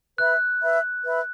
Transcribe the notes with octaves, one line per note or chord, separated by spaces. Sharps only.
B4 E5 B5 F#6
B4 E5 B5
B4 E5 B5